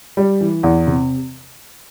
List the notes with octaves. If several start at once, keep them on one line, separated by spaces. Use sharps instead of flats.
G3
E3
E2
C3